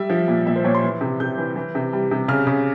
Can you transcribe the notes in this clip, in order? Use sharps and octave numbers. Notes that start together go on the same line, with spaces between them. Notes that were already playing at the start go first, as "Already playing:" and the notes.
Already playing: G3 E5
F3
A#2
A#2 E5
C5
A#2 C#5
C6
E3
C3
C3 G6
E3
E3
C3
G3
C3
C#3 F6
C#3